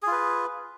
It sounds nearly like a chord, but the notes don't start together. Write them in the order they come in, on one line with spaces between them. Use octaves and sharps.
G#4 F4 B4